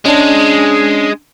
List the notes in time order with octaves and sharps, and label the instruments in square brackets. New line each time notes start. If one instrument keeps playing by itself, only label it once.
[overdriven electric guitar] G#3 [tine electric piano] C#4 D4